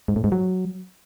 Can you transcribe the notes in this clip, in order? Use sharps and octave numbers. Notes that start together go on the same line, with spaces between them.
G#2
A2
G#2
F#3